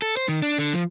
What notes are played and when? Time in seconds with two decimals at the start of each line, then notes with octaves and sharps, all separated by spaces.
0.02 A4
0.17 C5
0.29 D#3
0.42 D4
0.58 D3
0.73 F3